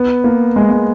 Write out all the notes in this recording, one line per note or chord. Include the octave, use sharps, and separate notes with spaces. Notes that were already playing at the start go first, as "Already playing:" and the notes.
Already playing: B3
A#3
G#3
G#3